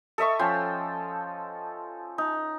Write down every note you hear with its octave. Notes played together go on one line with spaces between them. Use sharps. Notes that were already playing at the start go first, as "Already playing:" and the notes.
A4 D#5 E5 C#6
F3 C#4 G5 C6
D#4